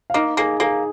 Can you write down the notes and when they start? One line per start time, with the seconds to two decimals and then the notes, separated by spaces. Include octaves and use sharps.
0.10 F5
0.14 A#3 D#4 D#5
0.37 A#3 G#4 G#5
0.60 A#3 G#4 G#5